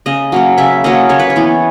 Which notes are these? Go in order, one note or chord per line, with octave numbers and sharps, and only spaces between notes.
C#3 D#5
F#3 A#3 C#4
C#3 E5
F#3 A#3 C#4 D#5
C#3 C#5
B4
C#5
E3 B3